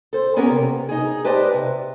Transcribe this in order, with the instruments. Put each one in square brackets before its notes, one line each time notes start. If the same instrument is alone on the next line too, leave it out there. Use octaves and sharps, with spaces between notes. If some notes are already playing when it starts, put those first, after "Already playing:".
[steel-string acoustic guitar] A4 C5
B3 C#4 G4 A#4 B4 C#5
C3
D#4 G#4
G4 B4 C5 D5 D#5 A5
C3